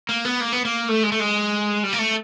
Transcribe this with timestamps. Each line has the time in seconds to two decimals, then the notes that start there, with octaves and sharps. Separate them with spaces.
0.09 A#3
0.25 B3
0.40 A#3
0.53 B3
0.65 A#3
0.89 A3
1.03 G#3
1.12 A3
1.20 G#3
1.83 G3
1.93 A#3
1.99 A3